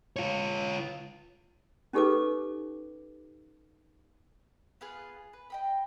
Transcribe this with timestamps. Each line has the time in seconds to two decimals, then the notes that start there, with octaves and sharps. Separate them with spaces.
0.16 F4 C#5
1.93 C#4 D#4 G4 A4 B4 D6
4.81 B3 F4 G#4 B4
5.33 B4
5.50 D#5 G5 B5